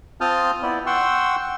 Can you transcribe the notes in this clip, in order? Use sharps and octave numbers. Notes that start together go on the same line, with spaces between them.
C4 F4 A5 D#6 F6 G6
B3 E4 D5
F#5 G5 C6 C#6 E6